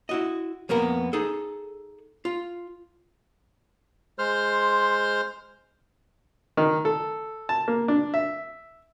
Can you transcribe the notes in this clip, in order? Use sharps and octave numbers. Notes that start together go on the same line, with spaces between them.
E4 F#4 D#5
F2 A#3 B3 A#4 B5
D#4 G#4 A4
F4
G#3 C5 C6 F6
D#3
A4
A5
A#3
D4
E5